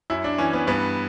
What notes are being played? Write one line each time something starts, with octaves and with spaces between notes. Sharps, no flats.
F#2 E4
D4
E3 C#4
B3
G2 B3